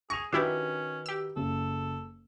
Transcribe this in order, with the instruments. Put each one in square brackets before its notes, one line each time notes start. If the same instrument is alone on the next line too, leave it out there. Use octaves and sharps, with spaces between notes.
[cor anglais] G#4 [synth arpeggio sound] C#6 [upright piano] A#6 D#7 F7
[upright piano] D#3 F#4 B4 [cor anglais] C#4 [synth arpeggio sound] D4 E4 G4
[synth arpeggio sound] G4 E6
[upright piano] F#1 C#3 [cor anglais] A4